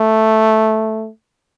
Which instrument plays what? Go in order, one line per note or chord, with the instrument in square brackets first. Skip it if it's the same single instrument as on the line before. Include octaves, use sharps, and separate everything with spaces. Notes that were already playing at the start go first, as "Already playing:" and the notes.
Already playing: [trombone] A3